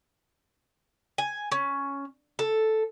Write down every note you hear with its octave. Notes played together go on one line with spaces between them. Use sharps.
G#5
C#4
A4